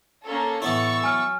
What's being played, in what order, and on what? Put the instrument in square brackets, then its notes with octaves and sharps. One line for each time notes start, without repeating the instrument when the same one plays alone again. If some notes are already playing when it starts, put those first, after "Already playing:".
[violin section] A#3 C#4 A4
[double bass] A2 [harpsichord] E3 B3 E4 [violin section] C#6 E6 A6
[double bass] F#3 [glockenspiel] G#5 F6